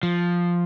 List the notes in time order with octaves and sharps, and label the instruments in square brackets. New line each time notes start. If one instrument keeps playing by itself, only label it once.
[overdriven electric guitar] F3